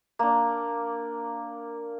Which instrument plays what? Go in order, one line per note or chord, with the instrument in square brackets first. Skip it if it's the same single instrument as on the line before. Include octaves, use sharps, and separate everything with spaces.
[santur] A#3 D4